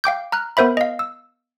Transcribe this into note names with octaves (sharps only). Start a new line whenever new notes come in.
F5 G5 D6 G6
A#5 F6 F#6
B3 A#4 C5 E5 B5
D#5 F5
E6